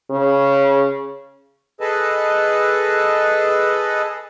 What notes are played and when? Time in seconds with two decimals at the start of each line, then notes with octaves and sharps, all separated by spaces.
0.10 C#3
1.81 G#4 A4 B4 D#5 A5